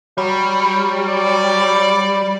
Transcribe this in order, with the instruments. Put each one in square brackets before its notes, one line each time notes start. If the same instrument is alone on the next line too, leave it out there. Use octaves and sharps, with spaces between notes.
[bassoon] F#3 [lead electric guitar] G3
[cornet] D5